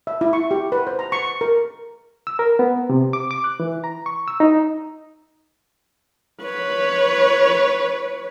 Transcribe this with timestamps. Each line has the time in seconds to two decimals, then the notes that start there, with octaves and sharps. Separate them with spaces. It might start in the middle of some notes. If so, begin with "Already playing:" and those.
0.07 E5
0.21 E4
0.33 C#6
0.51 G4
0.72 B4
0.87 C5
0.99 A#5
1.12 C#6
1.25 C#6
1.41 A#4
2.27 E6
2.39 A#4
2.59 B3
2.90 C3
3.13 D6
3.31 D6
3.44 F#6
3.60 E3
3.84 A#5
4.06 C#6
4.28 E6
4.40 D#4
6.43 B4 C#5